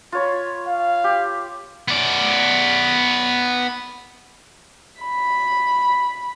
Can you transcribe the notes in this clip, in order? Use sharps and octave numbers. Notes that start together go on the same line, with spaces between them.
F4 C#5 B5
F5
G4
B3 D5
B5